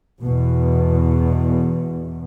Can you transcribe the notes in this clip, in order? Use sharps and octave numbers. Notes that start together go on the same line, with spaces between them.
E2 B2